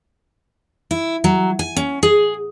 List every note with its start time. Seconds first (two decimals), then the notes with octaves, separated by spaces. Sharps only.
0.91 E4
1.24 F#3
1.59 G#5
1.76 C#4
2.03 G#4